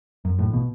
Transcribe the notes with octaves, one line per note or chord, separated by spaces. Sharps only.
F#2
A1 A2
B2